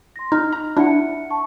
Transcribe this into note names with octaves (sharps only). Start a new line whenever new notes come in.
C6 A#6
D#4 F6
A#5
D4 E4 E5 F#5 C#7
A5 C#6